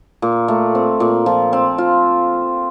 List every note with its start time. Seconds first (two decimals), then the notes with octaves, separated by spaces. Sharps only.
0.22 A#2
0.48 A3
0.75 C4
1.00 A#2
1.26 F3
1.53 C4
1.78 F4